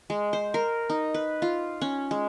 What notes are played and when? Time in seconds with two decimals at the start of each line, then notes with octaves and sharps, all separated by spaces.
0.10 G#3
0.33 C5
0.54 A#4
0.90 D#4
1.14 B4
1.42 F4
1.81 C#4
2.11 G#3